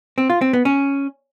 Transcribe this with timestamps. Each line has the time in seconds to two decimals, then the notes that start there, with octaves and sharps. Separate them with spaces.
0.18 C4
0.30 F4
0.41 C4
0.53 B3
0.65 C#4